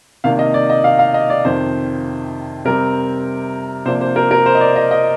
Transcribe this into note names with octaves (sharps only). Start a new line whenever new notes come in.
C3 D#3 A#3 D4 F5
D#5
D5
D#5
F5
F5
D#5
D5
F2 C3 D#3 C5
C3 G3 C4 A#4
C3 F3 A#3 D4 C5
C5
A#4
A#4
C5
D#5
D5
D#5
D#5